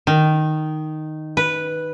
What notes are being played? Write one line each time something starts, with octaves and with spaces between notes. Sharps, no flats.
D#3
B4